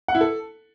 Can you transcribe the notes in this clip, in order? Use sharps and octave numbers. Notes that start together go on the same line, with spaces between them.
F#5
E4
A4